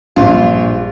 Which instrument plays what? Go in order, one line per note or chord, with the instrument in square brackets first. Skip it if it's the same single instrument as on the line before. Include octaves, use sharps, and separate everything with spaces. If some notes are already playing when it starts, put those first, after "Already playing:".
[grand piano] A#1 [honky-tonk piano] G2 [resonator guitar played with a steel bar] F4